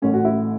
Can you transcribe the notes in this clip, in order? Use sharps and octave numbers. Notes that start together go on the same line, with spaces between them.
A1 A2 A3 C#4
F#4
E4